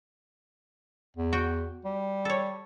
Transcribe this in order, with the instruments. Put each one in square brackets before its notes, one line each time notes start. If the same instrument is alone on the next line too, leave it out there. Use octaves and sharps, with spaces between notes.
[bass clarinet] E2
[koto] F#4 G5
[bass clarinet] G3
[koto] A4 C#5